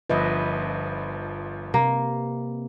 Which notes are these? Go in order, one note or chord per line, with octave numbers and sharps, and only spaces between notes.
G1 F3 B4 D#5 E5
C3 A#3